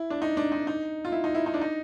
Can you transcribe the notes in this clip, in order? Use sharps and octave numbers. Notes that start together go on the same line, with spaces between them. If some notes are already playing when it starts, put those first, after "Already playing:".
Already playing: E4
D4
D#4
D4
D#4
D#4
F4
E4
D#4
E4
D#4
D4
D#4